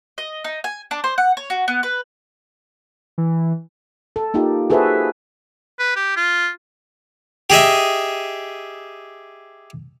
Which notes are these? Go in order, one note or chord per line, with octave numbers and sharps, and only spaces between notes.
D#5
D#4
G#5
D4
C5
F#5
C#5
F#4
B3
B4
E3
A4
A#3 D#4 F4 G4
F#4 G#4 A4 B4 C5 E5
B4
G4
F4
G4 G#4 D#5 E5